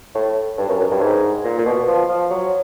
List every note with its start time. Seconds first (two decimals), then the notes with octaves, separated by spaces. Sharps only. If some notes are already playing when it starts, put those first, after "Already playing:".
0.15 A2
0.58 G2
0.69 F#2
0.79 F#2
0.91 G2
1.01 G#2
1.45 A#2
1.59 A#2
1.66 B2
1.87 F3
2.09 F3
2.31 F#3